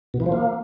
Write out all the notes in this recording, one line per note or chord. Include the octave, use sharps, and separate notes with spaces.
B2
E3
F3
A#3